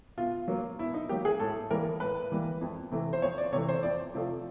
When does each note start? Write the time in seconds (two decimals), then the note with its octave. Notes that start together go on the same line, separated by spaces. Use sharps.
0.18 B2 F4
0.48 F#3 A#3
0.79 B2 E4
0.94 D#4
1.09 F#3 A#3 G4
1.25 G#4
1.39 A2 A4
1.70 E3 G3 A#3 A#4
2.00 A2 B4
2.32 E3 G3 A#3
2.61 F2
2.91 C3 E3 A3
3.13 C5
3.22 F2 C#5
3.38 D5
3.52 C3 C#5
3.55 E3 A3
3.68 C5
3.83 F2 D5
4.14 C3 F3 A3